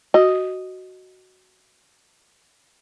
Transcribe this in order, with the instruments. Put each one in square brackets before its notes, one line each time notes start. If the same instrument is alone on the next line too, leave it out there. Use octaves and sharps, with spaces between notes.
[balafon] F#4 [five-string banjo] D#5